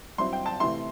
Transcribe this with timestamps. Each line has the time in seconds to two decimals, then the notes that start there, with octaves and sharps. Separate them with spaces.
0.18 G2 F#3 C4 E4 C6
0.33 G5
0.46 A5
0.60 C3 E3 A3 E4 C6